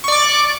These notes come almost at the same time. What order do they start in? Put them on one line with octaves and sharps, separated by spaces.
C#6 D5 D6